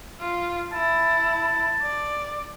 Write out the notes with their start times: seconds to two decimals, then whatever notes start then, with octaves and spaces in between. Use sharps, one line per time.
0.20 F4
0.73 E4 A5
1.82 D5